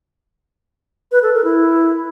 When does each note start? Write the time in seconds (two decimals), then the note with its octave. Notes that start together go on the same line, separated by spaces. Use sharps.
1.12 B4
1.23 A4
1.33 A#4
1.44 E4